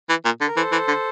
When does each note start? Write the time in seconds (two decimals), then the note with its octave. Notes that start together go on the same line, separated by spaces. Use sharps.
0.10 E3
0.25 A#2
0.41 D3
0.48 A#4
0.56 E3 A4 C5
0.72 E3
0.88 D3